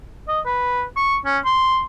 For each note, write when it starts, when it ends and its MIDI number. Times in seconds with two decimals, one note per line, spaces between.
0.28 0.40 75
0.46 0.84 71
0.97 1.17 85
1.25 1.38 61
1.45 1.83 84